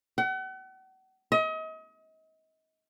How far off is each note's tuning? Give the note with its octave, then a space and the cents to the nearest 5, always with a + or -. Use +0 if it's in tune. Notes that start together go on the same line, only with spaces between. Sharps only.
F#5 +40
D#5 +35